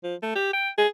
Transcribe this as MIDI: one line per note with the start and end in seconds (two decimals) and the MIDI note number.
0.04 0.15 53
0.23 0.35 57
0.36 0.49 67
0.53 0.70 79
0.78 0.87 68